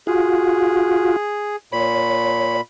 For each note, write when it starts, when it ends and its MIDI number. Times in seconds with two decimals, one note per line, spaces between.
0.07 1.16 65
0.07 1.16 66
0.07 1.56 68
1.72 2.61 46
1.72 2.57 73
1.72 2.61 83